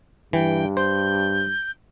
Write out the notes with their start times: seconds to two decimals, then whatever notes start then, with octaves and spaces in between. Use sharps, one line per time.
0.33 G2 E3 G5
0.77 C5 G6